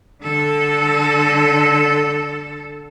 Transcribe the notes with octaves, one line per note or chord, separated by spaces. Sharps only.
D3 A4